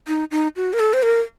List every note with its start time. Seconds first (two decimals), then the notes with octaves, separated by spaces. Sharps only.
0.08 D#4
0.31 D#4
0.56 F#4
0.73 A#4
0.79 A4
0.93 C5
1.03 A#4